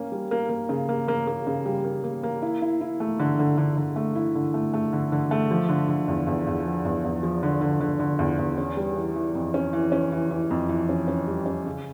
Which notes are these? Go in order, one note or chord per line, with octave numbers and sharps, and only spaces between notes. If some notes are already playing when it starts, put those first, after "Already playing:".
Already playing: A#3 C#4
G3
A#3
A#3
C#3
A#3
A#3
A#3
C#3
G3
A#3
A#3
A#3
E4
E4
E4
A3
D3
D3
D3
D3
A3
E4
D3
A3
A3
D3
D3
A3
F3
D3
D3
E2
E2
E2
F3
E2
E2
F3
D3
D3
D3
D3
E2
E2
C#4
G3
E3
E3
F2
C#4
E3
C#4
E3
E3
F2
E3
C#4
C#4
G3
C#4
C#3